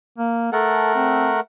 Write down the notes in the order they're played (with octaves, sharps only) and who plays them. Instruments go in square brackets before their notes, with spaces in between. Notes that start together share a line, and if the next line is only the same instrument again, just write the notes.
[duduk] A#3
[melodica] A3 A#4 F#5 [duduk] A4
[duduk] C4